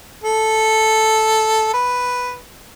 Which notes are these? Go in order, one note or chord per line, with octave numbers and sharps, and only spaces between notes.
A4
B4